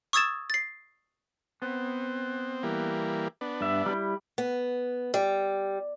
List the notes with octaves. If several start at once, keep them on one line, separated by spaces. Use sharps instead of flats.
C#6 D#6 E6 G#6 A6 E7
A6 C7
B3 C4
E3 G3 A#3
B3 D4
G2 E5
G3 E4
B3
G3